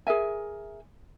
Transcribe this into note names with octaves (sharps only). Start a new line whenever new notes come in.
G#4 A#4 E5 G#5